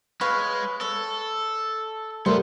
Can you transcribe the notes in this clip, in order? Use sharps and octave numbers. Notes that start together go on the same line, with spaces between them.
G#3 B4 C#5 F5
A4 C#5
G3 A3 B3 A#4 C5